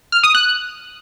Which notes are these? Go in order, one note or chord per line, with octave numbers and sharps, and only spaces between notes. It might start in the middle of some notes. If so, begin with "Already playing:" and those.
F6
D#6
F#6